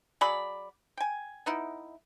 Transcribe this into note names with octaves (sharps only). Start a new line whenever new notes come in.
F#3 G#4 D5 B5
G5 G#5
B3 D#4 E4